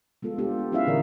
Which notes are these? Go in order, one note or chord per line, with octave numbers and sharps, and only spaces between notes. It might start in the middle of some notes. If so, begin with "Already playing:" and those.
G#3 B3 F4 A4
B3 D4 F4 G4 A4
B3
C#4 D4 E4 G#4 E5 F5
A#2 D3 E3 A#4 D5 D#5